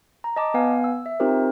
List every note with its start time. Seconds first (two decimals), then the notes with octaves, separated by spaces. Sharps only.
0.24 A#5
0.36 D#5 A5 D6
0.54 B3 B4 F5 G#5
0.84 E6
1.06 E5
1.20 C4 D#4 F4 G4 A#4 C5